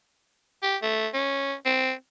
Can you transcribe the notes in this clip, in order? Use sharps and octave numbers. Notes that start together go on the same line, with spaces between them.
G4
A3
C#4
C4